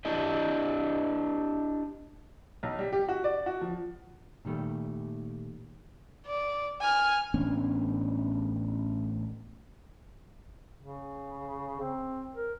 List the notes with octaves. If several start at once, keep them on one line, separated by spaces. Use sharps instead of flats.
D4 E4 G4 D#5
B1
G3
G4
F#4
D5
F#4
F3
A#2 D#3 G3 A3
D5
G#5 F6
A1 B3 C#4 D4
C#3
C4
A#4